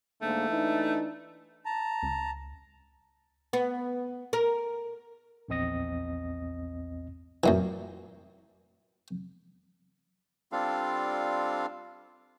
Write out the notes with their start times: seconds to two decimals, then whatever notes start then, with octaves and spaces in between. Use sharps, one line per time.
0.22 G#2 D3 A3 A#3
0.50 E3 D4 D#4
1.65 A5 A#5
2.03 C#2
3.53 B3
4.33 A#4
5.48 A#1 E2 C4 D#5 D#6 A#6
7.44 F#2 A#2 E3
10.52 G3 C4 D4 F4 A4 F5